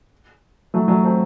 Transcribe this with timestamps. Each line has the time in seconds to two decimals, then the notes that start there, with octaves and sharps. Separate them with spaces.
0.74 F#3 A3
0.88 F#3 A3
1.03 A3 C4